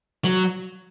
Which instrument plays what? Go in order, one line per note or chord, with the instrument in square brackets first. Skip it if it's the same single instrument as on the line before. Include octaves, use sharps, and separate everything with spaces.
[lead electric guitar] F#3